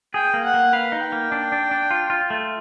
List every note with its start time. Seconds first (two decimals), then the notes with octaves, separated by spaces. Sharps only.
0.14 G#4 G5
0.34 A#3
0.44 F#5
0.54 A#3
0.73 B4 F5
0.92 D#4
1.03 G5
1.12 A#3
1.32 D4
1.52 D4
1.71 D4
1.91 F4
2.10 F4
2.30 A3